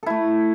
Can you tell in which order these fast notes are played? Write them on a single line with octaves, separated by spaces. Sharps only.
A4 E4 A3